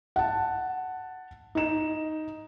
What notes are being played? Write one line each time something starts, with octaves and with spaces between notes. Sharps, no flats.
F#5 A5
D#4 E7